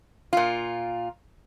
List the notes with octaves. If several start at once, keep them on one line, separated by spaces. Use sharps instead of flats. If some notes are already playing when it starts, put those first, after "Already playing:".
A#2 F4